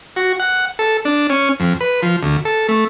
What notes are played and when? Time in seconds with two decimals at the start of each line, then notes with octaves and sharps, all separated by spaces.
0.16 F#4
0.40 F#5
0.79 A4
1.05 D4
1.30 C#4
1.60 F2
1.81 B4
2.03 F3
2.23 D2
2.45 A4
2.69 A3